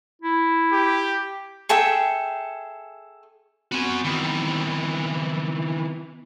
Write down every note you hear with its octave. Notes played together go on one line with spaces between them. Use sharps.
E4
G4
G#4 A4 E5 G5
B3 C4 F#4 G#5
D#3 E3